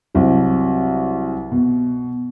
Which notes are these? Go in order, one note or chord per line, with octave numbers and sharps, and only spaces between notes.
C2 F#3
B2